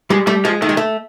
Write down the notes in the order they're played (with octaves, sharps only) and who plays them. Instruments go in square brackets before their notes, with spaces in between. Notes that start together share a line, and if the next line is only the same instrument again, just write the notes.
[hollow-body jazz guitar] G3 [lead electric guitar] G#3
[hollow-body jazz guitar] G3 [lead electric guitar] A3
[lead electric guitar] F3 [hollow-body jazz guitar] G#3
[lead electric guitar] D#3 [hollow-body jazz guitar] A3
[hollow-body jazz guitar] G#3
A3